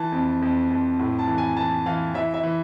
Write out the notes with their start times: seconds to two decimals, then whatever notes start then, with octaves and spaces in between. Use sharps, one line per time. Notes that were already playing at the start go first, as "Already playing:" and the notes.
Already playing: E3 A5
0.12 F2
0.42 F2
0.70 F2
0.99 A2
1.19 A5
1.27 E3
1.38 G#5
1.57 E3 A5
1.86 E3 F5
2.14 E3 E5
2.34 E5
2.43 E3